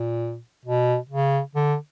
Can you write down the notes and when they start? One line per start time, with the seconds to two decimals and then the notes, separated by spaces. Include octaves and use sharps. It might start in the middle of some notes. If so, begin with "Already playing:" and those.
Already playing: A#2
0.65 B2
1.09 C#3
1.55 D3